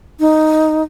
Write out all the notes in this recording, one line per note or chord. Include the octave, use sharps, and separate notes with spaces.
D#4